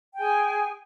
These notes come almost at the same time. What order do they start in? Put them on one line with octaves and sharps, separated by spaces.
G5 G#5 G#4